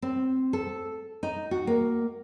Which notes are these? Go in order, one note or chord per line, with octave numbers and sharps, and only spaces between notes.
C4
A4
D#4
F#4
A#3